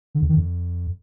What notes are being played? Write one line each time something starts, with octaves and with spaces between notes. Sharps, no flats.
D3
E2
D#3
F2